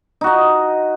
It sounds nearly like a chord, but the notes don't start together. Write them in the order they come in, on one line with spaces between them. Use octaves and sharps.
D#4 F#4 D#5